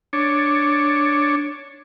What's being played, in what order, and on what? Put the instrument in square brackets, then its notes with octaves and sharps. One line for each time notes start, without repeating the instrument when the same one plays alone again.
[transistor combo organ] D4 C#5